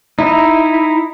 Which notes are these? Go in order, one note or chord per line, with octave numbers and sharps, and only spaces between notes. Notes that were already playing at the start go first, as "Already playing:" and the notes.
D#4 E4